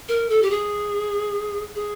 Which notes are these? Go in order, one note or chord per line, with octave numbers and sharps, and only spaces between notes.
A#4
A4
G4
G#4
G#4